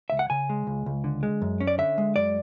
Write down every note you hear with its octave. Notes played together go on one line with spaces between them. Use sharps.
C#2 E5
F#5
C#3 G#5
G#3
C#2
C#2
D3
G#3
F#2
C#4
D5
D3 E5
G#3
F#2 D5